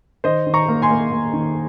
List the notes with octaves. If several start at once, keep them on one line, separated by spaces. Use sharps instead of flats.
D#3 C5 D#5
D#3
A#5 C#6
A#3
G#5 C6
A#3
A#3
D#3